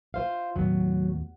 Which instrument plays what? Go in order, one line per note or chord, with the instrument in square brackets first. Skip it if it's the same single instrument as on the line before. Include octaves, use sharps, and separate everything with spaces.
[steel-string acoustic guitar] F4 C5 F5
[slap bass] D#2 A2 B3 [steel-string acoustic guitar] F#3